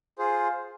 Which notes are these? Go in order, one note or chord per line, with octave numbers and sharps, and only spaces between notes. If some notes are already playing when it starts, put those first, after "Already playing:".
F4 G#4 C5